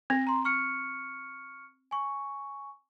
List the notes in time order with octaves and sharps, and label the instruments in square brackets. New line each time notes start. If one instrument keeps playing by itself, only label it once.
[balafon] C4 [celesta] A#6
[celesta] A#5 C6
C#6 F6 C#7
G#5 C#6